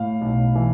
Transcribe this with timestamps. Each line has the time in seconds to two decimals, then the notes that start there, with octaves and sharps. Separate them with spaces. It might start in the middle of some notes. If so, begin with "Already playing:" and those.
Already playing: A2 F5
0.21 B1
0.55 E3